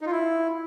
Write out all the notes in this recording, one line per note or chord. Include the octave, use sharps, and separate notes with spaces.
D#4
F4
E4